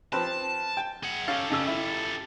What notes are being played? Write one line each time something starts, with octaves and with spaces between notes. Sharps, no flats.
F3 C4 B4 A5
G5
G#4 F#5
C#4 G4 A4 F5
F2 C#3 E6
E4